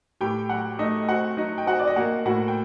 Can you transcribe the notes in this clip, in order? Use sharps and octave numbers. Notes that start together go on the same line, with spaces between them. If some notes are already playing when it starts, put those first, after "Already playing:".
A2 G4 G5
F#3 F#4 F#5
A3 D#4 D#5
C4 F#4 F#5
F#3 D#4 D#5
G5
C4 F#4 F#5
D5
D#5
A#3 F#4 F#5
A2 F#4 F#5
G5